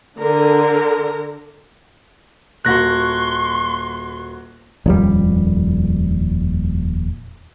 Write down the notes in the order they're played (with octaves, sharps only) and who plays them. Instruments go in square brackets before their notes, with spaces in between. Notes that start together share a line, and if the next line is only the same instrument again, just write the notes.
[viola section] D3 [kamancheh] A#4
[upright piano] D#1 A#3 F#4 [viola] C6 C#6 [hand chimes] F#6 A#6
[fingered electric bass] D#1 F2 G3